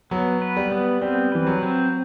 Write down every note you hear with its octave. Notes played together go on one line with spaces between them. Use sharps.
F#3 B3
B4
G3
B3
G3 C4
E3 B4
F#3
C4